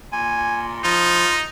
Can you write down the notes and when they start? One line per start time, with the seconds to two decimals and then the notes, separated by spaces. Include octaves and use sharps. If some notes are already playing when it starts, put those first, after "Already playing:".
0.13 A#2 G#5
0.84 F3 D#4 F4